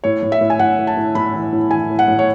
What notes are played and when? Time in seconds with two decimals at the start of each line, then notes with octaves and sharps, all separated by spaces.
0.04 A2 C#5
0.23 A2
0.32 E5
0.41 A2
0.50 G#5
0.59 A2 F#5
0.79 A2
0.87 A5
0.97 A2
1.15 A2 B5
1.34 E3
1.52 A2
1.71 E3 G#5
1.90 A2
1.99 F#5
2.08 A2
2.19 C#5